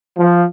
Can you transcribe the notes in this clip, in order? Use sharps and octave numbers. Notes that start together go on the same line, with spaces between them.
F3